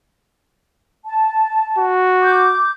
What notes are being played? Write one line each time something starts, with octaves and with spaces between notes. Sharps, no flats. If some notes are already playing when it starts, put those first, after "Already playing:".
A5
F#4
D6 G6